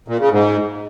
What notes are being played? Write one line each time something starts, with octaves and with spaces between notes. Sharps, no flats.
A#2
C#3
G#2